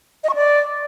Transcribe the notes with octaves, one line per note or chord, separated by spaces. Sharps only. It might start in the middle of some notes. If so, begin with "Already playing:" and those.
D#5
C#6
D5